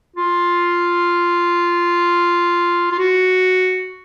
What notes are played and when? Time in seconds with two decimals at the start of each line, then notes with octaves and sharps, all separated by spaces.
0.16 F4
2.92 F4
2.99 F#4